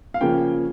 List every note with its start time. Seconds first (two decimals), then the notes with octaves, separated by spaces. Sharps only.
0.14 F5
0.21 C#3 F3 A#3 C#4 G5